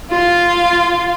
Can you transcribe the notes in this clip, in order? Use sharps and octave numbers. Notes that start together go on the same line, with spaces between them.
F4 F5